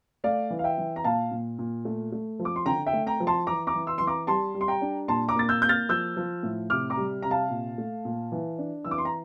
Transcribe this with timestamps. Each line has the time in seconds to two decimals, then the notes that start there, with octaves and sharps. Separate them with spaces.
0.24 A3 D5 F5
0.50 E3
0.59 F5
0.64 E5 G5
0.78 E3
0.96 A#5
1.04 A#2 F5 A5
1.31 A#2
1.59 A#2
1.85 A3
2.12 A3
2.39 F3
2.45 D6
2.56 C6
2.66 D3 G5 A#5
2.86 E5 G5
2.93 A3
3.07 G5 A#5
3.20 F3
3.27 A5 C6
3.47 E3 A#5 D6
3.67 A#5 D6
3.74 E3
3.87 C6 E6
3.98 E3 C6
4.07 A#5 D6
4.27 G3 A5 C6
4.55 G3
4.61 C6
4.68 G5 A#5
4.82 D4
5.08 A#2 A5 C6
5.28 A#5 D6
5.36 A#3 A6
5.49 E6 G6
5.62 A#3 G6
5.69 F6 A6
5.89 F3 E6 G6
6.17 F3
6.43 A2
6.70 C3 D6 F6
6.90 A#5 D6
6.97 G3
7.22 C3 A#5
7.31 F5 A5
7.50 A#2
7.78 A3
8.05 A#2
8.32 E3
8.58 D4
8.85 E3 E6
8.91 D6
8.98 C6
9.05 A#5